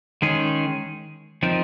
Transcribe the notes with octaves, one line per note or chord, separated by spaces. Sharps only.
D#3 G#3 C#4 G#4
F3 C4 D#4 A#4